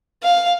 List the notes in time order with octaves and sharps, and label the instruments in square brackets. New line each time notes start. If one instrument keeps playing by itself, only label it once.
[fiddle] F5